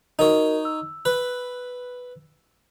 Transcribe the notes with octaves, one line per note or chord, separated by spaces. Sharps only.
D#4 F#4 A#4 C#5 D#5
E6
B4